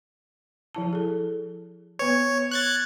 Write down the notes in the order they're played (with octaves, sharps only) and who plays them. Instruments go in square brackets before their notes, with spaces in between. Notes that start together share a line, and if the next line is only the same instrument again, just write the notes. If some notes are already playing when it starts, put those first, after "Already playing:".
[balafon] F3 E4 A5
G#4 A4
[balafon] B3 B4 [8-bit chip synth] C#5
[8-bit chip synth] F#6 G#6 A6